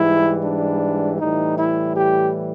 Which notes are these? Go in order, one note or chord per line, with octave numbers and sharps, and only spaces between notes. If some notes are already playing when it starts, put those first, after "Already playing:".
Already playing: G#2 E3 G3 E4
D4
A2 E3 G3 D#4
E4
G4